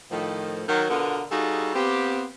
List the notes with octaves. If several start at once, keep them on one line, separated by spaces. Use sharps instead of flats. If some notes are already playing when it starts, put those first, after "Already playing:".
A2 D#3 F3
D#3 F#3 A#4
B2 D3 B3 F4 A#4
G3 D#4 F4 F#4 G#4 A4
B3 C4 F4 G4